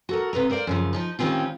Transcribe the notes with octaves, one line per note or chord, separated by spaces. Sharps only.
F#4 A4 A#4
C3 B4 D#5 A#5
A#4 C5 D5 F5
F#2 C#3 F3
F3 F#3 D#4
A2 D#3 G3 C4 C#4 F4